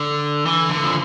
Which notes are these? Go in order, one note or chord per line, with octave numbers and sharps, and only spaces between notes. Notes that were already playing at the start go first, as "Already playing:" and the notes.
Already playing: D3
E3
D3
F3